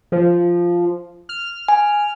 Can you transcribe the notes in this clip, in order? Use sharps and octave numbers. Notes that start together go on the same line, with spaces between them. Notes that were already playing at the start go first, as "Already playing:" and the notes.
F3
F6
G#5